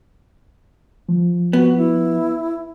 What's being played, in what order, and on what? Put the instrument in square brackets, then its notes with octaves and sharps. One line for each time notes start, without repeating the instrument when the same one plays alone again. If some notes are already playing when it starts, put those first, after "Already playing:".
[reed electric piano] F3
[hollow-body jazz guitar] B3 [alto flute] F#4
[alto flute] E4